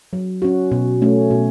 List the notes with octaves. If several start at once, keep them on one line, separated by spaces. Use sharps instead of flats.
F#3
C#4 F#4
B2
A3 C#4
B2